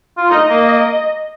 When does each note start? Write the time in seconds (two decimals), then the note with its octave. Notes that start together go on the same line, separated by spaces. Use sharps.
0.17 F4
0.31 D#4 D#5
0.50 A#3